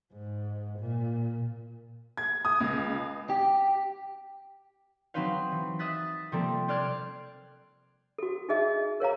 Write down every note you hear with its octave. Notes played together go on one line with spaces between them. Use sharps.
G#2
A#2
G#6
D#6
C#2
G4
F#3 C4 D#4 B4 C5 F5
E3
E5 D#6 F#6 A6 B6
C3 F3 G3 A#3 C4 A4
C5 D5 F6 F#6 G#6
F#4 A4
D#4 G#4 D#5 E5
A#4 C#5 F5 A#5